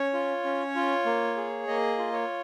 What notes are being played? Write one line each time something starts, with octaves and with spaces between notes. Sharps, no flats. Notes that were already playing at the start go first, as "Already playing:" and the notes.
Already playing: C#4 C#5
F4
C#4
F4
A#3
G#4
A#3 D#5
F4
C#5